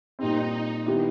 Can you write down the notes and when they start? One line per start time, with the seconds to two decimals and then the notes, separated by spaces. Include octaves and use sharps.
0.19 A#2 G3 C4 D#4
0.86 D#3 G3 B3 E4 G4